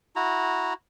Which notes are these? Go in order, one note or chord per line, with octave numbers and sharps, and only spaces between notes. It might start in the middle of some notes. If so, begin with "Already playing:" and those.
E4 F#4 A#5